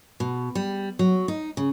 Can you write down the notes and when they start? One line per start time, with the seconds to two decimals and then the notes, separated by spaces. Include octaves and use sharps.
0.20 B2
0.55 G3
0.99 F#3
1.28 D#4
1.57 C#3